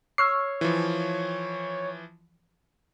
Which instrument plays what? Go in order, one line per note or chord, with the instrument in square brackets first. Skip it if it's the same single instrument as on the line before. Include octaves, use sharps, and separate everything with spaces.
[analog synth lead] C#5 [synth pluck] C#6 E6 F6 [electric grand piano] C7
[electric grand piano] E3 F3